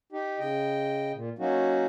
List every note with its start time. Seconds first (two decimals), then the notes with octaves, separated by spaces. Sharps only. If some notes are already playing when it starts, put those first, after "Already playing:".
0.12 D#4 G4
0.39 C#3 D#5 G5
1.15 A#2
1.39 F#3 A#3 C#4 D#4 F#4